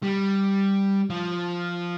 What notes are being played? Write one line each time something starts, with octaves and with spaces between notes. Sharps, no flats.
G3
F3